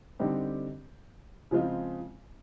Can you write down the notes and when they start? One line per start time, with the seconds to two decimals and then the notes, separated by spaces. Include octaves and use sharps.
0.19 D3 G3 C4 D#4 G4
1.51 C#3 F3 G#3 C4 F4